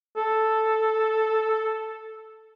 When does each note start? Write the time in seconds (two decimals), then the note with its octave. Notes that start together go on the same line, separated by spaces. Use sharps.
0.17 A4